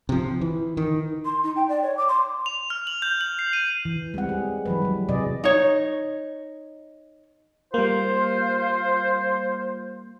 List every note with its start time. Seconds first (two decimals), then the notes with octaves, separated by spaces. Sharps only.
0.09 C3 F3
0.41 E3
0.77 D#3
1.25 C6
1.43 D#4
1.56 G5
1.69 D5
1.83 C#5
1.97 D6
2.08 C6
2.46 F7
2.70 F6
2.87 F#7
3.02 G6
3.21 F#7
3.39 C7
3.53 D#7
3.85 E3
4.14 G3 G#3 C4 F#5
4.29 G#3 G#4
4.66 E3 F#3 B4
4.82 F#3 G3
5.09 C3 F#3 G#4 D5 D#5
5.44 D#4 C#5
7.74 G3 A#3 F4 C5